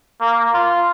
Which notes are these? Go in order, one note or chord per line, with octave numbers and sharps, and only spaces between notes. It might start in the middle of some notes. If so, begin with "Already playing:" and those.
A#3
F4